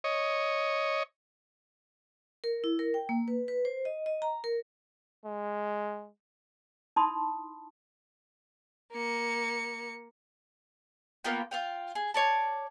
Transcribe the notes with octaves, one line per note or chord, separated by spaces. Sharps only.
C#5 D#5
A#4
E4
A#4
G5
A#3
B4
B4
C5
D#5
D#5
A#5
A#4
G#3
D#4 E4 A5 B5 C6 D#6
A#3 C#7
A#3 B3 F4 G5
F4 F5 G5
G#4
C#5 D5 A5